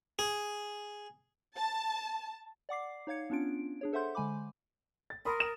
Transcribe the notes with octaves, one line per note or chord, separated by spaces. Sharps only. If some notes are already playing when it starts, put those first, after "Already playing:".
G#4
A5
D5 F#5 D6 C7
D#4 C#5 F5 G#6 C#7
B3 C#4 D4 F4 D7
D4 G#4 C#5
A4 C5 E5 F#5 C6 G6
D3 G#3 G#5 B5 D6
A6
A#4 B5 C6 D#6
D#6 E7